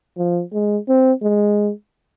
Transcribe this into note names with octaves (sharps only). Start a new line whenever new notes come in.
F3
G#3
C4
G#3